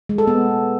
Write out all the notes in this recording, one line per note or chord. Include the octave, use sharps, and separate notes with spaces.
G#3
A4
B3